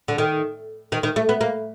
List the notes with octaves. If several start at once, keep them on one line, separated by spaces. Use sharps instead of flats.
D3
D#3
D#3
D#3
A3
B3
A#3